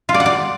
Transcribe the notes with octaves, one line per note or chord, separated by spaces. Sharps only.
F4
D5
F#5
D5